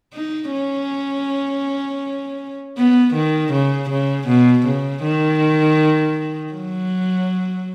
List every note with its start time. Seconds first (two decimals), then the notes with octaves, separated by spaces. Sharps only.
0.14 D#4
0.52 C#4
2.78 B3
3.14 D#3
3.53 C#3
3.90 C#3
4.28 B2
4.66 C#3
5.03 D#3
6.53 F#3